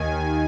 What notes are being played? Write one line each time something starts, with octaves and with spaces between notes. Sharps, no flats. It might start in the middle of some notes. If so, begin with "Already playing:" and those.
Already playing: D#2 D#3 G#5